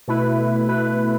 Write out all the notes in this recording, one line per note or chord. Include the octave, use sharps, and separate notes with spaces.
B2 A3 E4 B4
B2 A3 E4 B4